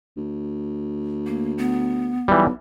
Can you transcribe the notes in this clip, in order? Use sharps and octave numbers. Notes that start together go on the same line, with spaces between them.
D2
A#3
B3
B1 E3 G3